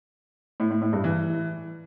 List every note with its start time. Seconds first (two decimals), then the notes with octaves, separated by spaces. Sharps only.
0.60 A2
0.71 A2
0.82 A2
0.93 G2
1.04 E3